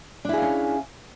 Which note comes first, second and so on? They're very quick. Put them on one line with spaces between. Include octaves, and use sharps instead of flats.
D4 E4 G#4 F5 C#4